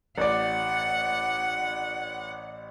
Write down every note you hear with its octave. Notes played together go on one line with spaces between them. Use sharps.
A1 D5 F#5